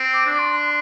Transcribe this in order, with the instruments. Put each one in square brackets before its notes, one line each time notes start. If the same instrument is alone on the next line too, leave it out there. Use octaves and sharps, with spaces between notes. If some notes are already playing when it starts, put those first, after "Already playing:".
Already playing: [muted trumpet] C4
[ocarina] D6
[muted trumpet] D4
[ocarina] D6
C6
C6